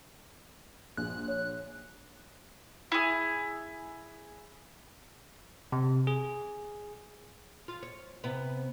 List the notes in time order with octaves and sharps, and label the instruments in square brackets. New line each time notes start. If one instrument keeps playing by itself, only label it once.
[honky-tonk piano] A#1 [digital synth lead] F#6
[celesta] C#5
[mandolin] E4 G#4
[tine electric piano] C3
G#4
[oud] F4
C#5
C3 B3